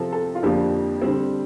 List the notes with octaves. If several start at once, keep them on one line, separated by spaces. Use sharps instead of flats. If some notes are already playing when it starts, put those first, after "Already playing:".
Already playing: C3 F3 C4 A4
A4
F4
F2 D3 F3 A#3 D4 G4
D3 G3 C4